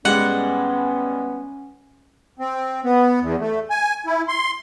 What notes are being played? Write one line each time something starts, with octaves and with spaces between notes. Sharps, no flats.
G#2 G3 G#3 B3 C#4 F#5
C4
B3
E2
A3
G#5
E4
C6